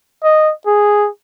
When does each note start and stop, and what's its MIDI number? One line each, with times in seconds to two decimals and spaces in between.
0.23 0.52 75
0.66 1.08 68